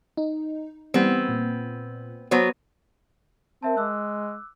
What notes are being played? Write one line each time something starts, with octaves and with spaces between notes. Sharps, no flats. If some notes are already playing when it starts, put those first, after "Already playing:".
D#4
E3 G3 B3 C4
A#2
F#3 B3 B4 C5
C4 A#4 E5 A5
G#3 D6 E6 F#6